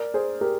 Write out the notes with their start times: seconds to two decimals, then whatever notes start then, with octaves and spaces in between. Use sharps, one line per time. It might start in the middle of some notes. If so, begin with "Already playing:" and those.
Already playing: A#4 D5
0.14 G#4 C5
0.41 G4 A#4